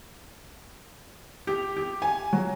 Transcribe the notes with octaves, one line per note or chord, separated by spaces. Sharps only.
G4
G4
G#5
F#3